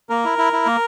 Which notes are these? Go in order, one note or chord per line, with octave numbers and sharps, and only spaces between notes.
A#3 A#4
E4
E4
E4
A#3